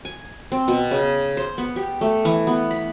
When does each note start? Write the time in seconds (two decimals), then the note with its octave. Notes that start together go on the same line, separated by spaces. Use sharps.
0.05 G#5
0.52 C4
0.68 B2
0.91 C#3
1.37 C5
1.58 B3
1.76 G4
2.01 A3
2.25 E3
2.47 B3
2.71 B5